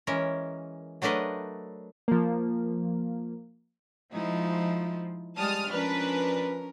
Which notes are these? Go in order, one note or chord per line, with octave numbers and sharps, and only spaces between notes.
E3 G#3 C#4 A#4
F#3 A3 D4 A#4 B4 D#5
F3 A#3
F3 G#3 D#4 E4
G3 G#3 A5 D#6 F6
F3 C#4 D4 A#4 B4